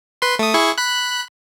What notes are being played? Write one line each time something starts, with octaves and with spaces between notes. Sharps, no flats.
B4 C6
A3 D#6
E4 G#4 C#6
B5 F#6